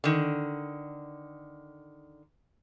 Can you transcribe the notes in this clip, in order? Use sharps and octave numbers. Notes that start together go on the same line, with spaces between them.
D3 D#3